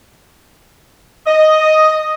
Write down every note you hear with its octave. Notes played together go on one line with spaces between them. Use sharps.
D#5